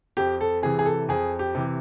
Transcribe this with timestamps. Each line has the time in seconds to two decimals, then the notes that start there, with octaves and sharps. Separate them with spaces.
0.17 F2 G4
0.41 A4
0.63 C3 E3 G#4
0.79 G#4
0.86 A4
1.09 F2 G#4
1.39 G4
1.55 C3 E3